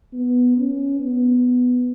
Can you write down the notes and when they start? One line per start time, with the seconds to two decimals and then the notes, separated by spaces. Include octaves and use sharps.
0.13 B3
0.57 C#4
1.00 B3